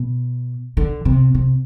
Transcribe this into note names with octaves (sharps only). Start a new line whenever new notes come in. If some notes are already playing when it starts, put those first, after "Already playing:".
Already playing: B2
D3
C3
C3